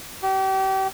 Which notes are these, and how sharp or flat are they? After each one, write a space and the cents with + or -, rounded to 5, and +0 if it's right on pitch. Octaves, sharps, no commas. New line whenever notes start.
G4 -35